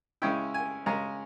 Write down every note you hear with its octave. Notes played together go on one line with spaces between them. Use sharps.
C#3 G#3 C#4 E4 G5
G#5
C#3 G#3 C#4 A#5